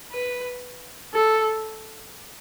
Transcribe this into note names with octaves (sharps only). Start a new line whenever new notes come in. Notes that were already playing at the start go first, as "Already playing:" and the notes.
B4
A4